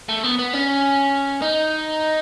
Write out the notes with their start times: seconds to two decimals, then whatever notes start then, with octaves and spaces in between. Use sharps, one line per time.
0.09 A3
0.23 B3
0.38 B3
0.53 C#4
1.42 D#4